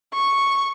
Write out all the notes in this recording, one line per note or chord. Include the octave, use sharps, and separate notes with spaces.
C#6